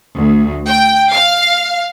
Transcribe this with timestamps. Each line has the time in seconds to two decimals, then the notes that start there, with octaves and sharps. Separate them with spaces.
0.18 D2
0.66 G5
1.12 F5